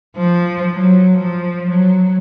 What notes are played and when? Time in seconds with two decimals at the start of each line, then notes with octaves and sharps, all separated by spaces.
0.17 F3
0.74 F#3
1.18 F3
1.69 F#3